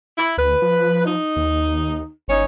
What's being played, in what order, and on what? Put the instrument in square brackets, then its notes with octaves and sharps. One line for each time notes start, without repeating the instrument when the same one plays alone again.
[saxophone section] E4
[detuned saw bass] D2 [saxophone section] B4
[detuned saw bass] F3
[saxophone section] D#4
[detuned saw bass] D#2
[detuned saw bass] G1 [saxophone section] C#4 D#4 C#5